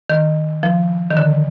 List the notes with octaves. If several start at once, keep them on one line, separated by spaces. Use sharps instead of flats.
D#3
F3
D#3
D3